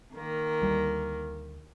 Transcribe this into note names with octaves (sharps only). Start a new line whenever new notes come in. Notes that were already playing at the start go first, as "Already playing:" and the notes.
D#3 A#3
D2 G3